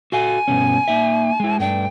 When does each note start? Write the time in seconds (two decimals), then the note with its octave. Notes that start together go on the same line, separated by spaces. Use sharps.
0.12 F#4 A4 F5 G#5
0.48 G2 B2 C#4
0.88 A#3 D#4 E5
1.40 G#3 E4
1.59 G2 A3 D4 G5